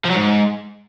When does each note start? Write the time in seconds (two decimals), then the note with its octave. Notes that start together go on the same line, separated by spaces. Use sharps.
0.05 F3
0.11 F#3
0.16 G#2